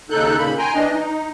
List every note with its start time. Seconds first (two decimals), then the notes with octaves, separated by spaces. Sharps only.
0.10 D#2 C#3 D#4 A4 F#6 G6
0.37 A#2 C#3 A#3 B5
0.59 G5 G#5 A#5 C6
0.74 E3 D4 D#5
0.92 D#4